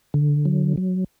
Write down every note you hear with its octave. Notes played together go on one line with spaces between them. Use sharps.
D3
F#3
F#3